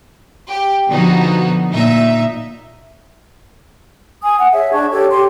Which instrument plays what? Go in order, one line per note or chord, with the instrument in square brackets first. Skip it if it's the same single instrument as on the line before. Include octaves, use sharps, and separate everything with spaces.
[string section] G4
B2 D3 F3 B3 D#4 F#4
A#2 D#4 E5
[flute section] G#5 D#6
F#5
G#4 C#5 E5
D4 A5 C#6 G#6
G4 A4 C#5
G4 C6